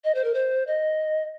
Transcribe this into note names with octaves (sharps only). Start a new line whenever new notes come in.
D#5
C5
A#4
C5
D#5